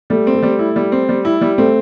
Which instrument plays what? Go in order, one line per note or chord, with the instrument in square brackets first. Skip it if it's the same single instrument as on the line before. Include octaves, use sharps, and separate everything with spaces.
[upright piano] G3 [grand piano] A3
[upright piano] C4
[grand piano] A3
[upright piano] G3
E4
G3
C4
G3
E4
G3
[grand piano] A3 [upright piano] C4